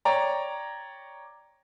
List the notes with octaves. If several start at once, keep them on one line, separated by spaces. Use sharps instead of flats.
C#5 D5 G5 A#5